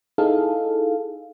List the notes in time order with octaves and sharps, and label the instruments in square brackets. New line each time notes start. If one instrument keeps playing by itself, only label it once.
[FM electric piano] D#4 E4 G#4 A4 F5